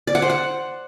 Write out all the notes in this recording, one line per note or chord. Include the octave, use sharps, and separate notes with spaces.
D5
F#5
C5
F#5